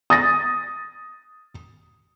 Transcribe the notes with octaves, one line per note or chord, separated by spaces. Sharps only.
D#6 A6 A#6